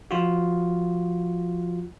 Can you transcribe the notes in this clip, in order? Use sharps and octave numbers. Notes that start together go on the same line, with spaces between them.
F3 F4 F#4